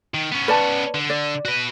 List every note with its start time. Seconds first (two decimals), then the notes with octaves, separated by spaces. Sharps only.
0.14 D#3
0.32 B3 C#4
0.48 B4 D5 A5
0.95 D3
1.10 D5
1.45 F#4 B4